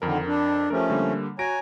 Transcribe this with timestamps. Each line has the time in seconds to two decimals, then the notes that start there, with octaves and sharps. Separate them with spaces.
0.02 F2 D3 D#3 A#4
0.27 D4
0.70 F3 A3 C#4 G4 A4 A#4
0.90 D3 G3 A#3
1.39 F#4 C#5 G#5 A#5 A#6 D7